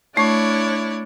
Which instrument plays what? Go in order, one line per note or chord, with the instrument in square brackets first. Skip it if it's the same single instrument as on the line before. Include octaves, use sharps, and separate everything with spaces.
[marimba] A3 C#6 [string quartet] D4 E4 C#5